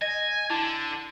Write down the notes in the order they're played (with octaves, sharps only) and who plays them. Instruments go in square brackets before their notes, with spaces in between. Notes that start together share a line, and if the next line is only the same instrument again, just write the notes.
[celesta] D#5 A#6 [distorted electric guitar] G#5
[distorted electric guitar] D3 [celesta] E4 A5 A6